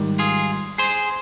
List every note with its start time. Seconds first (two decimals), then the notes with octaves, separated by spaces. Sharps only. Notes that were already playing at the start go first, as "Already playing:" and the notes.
Already playing: G#2 D#3 G3
0.19 F4 G#4
0.78 G#4 C5